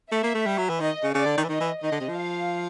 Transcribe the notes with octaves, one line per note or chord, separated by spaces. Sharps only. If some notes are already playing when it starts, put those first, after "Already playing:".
A3 E5
A#3
A3
G3
F#3
E3
D#3 D#5
C#3
C#3 D5
D3
D#3
E3
D#3 D#5
E3
D#3 D#5
D3
C3
F3
F5